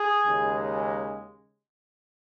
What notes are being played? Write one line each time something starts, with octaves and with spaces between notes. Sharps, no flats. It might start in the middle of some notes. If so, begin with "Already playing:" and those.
Already playing: G#4
D#2 C#3 G#3